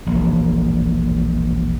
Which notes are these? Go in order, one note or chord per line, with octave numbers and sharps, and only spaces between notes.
E1 A#1